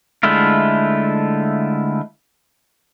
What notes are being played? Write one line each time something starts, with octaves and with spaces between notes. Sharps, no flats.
D3 G#3 A3 E4 F4